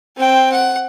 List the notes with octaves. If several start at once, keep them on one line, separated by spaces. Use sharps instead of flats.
C4 G5
F#5